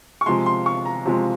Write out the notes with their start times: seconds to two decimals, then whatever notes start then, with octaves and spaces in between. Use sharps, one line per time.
0.21 C#6
0.26 C3 F3 G#3 C6
0.46 C6
0.66 C#6
0.85 A#5
1.05 C3 F3 G#3